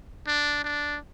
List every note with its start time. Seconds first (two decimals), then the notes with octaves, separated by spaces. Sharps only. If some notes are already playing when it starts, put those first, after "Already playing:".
0.27 D4
0.64 D4